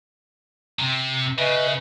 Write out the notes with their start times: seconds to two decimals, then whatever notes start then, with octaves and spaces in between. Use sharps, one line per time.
0.79 C3
1.38 C#3 B4 D#5 E5